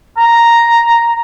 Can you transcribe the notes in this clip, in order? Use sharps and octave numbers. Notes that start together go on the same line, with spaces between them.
A#5